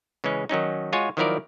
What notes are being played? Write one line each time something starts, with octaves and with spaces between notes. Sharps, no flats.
C#3 E3 G#3 C#4
D#3 F#3 C#4 D#4
G#3 F4 F#4 C#5 G#5
D#3 F3 F#3 E4 A#4 D5